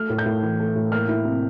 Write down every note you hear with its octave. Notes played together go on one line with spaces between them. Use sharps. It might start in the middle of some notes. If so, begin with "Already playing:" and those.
Already playing: A3 F6
A2
G6
A2
E3
A3
A2
A#3 F6
E4
C3